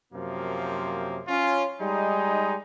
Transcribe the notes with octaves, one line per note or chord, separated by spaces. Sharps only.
F#2 C3 F3 A#3
C#4 F4
G3 G#3 D#4